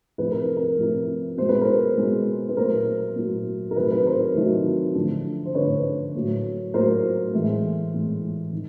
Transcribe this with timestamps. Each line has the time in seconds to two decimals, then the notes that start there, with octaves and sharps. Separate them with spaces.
0.18 C3 F3 A3 B4
0.31 A#4
0.56 A#4
0.78 C3 F3 A3
1.37 B2 G#3 C5
1.49 B4
1.61 A#4 C5
1.97 B2 G#3
2.49 B4
2.57 A#2 F#3 A3 A#4 C5
3.16 A#2 F#3 A3
3.71 A#4
3.76 C3 D#3 F#3 A3 B4
3.91 B4
4.06 A#4 C5
4.35 C3 D#3 F#3 A3
4.95 D3 F3 A3
5.46 C5
5.54 D3 F3 A3 B4 C#5
6.15 A2 F#3 A#3
6.74 A2 F#3 A#3 A#4 C5
7.33 A2 E3 G#3
7.93 A2 E3 G#3
8.53 D#3